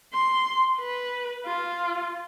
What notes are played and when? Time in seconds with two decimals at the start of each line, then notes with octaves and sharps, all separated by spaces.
0.14 C6
0.80 B4
1.46 F4